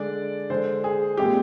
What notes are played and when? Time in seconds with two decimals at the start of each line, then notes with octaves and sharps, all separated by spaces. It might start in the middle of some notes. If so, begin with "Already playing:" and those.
Already playing: D3 G#3 D4 D5
0.50 D3 G#3 D4 C5
0.84 G#4
1.17 A#2 G#3 C4 G4